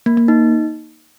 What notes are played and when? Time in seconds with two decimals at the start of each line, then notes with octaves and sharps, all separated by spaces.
0.06 A#3
0.17 A#3
0.28 D#4